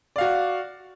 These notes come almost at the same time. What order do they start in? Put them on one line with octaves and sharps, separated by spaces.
D5 F5 F#4